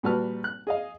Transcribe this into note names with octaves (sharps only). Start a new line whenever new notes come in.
A#2 G3 F#4 B4 A5 F6
F#6
G#4 D#5 F5